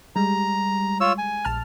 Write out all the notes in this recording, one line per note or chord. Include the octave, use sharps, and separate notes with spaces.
G3 G#3 A#5
F4 C#5 E6
G#5
A#1 A5 F6